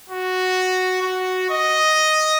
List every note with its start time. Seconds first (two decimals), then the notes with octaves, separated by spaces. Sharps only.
0.10 F#4
1.02 F#4
1.50 D#5